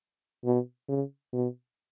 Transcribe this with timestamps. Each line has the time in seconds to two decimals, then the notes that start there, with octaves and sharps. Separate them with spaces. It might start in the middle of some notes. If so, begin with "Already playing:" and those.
0.45 B2
0.89 C#3
1.33 B2